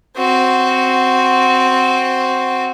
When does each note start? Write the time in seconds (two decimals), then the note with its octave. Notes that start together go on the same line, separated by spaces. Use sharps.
0.17 C4 F#4